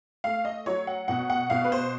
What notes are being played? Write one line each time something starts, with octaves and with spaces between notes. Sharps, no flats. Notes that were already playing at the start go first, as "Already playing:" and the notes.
A3 F5
D#5
F#3 C#5
F#5
B2 F#5
F#5
B2 F5
B4
C5